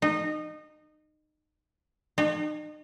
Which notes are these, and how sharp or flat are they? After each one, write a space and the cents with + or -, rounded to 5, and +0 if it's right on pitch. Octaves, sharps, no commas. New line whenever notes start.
D#4 -25
D#4 -40